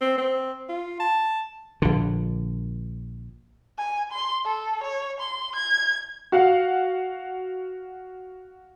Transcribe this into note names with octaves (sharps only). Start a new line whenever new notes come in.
C4
C4
F4
A5
A#1 D3
G#5
C6
A4
C#5
C6
G#6
F#4 F5 F#5